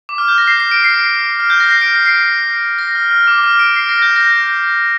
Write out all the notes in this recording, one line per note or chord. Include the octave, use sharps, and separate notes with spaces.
D6
F6
G6
A#6
C7
C7
D7
C7
F6
G6
A#6
C7
D7
C7
A#6
F6
F6
D6
F6
D7
C7
A#6
G6
A#6